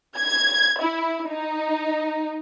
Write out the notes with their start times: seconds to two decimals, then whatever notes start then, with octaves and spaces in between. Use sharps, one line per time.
0.17 G#6
0.80 E4
1.30 D#4